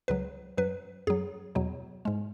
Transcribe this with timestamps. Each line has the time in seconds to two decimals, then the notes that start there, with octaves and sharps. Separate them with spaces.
0.08 C#2 C#3 F#3 B4
0.58 F#2 F#3 B4
1.07 F#2 F#3 G#4
1.55 E2 B2 F#3
2.05 G#2 G#3